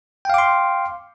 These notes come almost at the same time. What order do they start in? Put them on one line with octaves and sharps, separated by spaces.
G5 F5 D6 C6